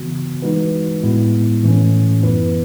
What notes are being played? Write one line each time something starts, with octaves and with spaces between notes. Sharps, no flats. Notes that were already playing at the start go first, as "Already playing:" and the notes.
Already playing: C#3 E3 B3 F#4
E3 G#3 D#4 F#4 B4
A2 G#3 B3 E4
A2 E3 A3 C#4
F#2 E3 B3 E4 B4